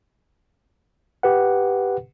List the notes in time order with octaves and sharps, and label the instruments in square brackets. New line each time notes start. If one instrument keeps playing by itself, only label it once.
[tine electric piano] G4 B4 F#5